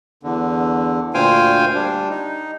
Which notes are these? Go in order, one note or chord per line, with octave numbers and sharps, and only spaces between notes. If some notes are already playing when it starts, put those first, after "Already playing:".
E2 D3
D2 A#2 C5 F5 G5 G#5
G3 D4
D#4